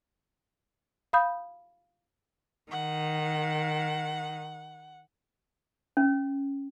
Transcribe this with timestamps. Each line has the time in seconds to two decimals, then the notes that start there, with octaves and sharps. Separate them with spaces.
1.13 F5 B5 D#6 G6
2.72 D#3 F#5
5.97 C#4